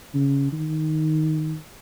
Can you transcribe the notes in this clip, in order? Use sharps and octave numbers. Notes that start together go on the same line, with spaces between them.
C#3
D#3